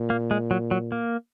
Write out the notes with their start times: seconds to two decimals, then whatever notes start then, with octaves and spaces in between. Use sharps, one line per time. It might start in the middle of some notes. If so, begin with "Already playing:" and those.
Already playing: A#2
0.10 A#3
0.31 G#3
0.51 F#3
0.71 F#3
0.92 A#3